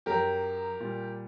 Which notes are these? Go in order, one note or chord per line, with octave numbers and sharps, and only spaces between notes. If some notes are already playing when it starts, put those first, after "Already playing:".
F#2 F#3 G4 A#4
A#2 G3